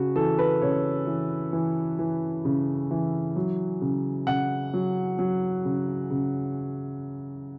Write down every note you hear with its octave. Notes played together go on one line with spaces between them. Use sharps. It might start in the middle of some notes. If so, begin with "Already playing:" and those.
Already playing: C#3 F#4
E3 A4
B4
C#3 C#5
E3
E3
E3
C#3
E3
F#3
C#3
C#3 F#5
F#3
F#3
C#3
C#3